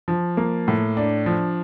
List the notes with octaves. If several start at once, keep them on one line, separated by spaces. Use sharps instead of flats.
F3
A#3
A2
D4
F3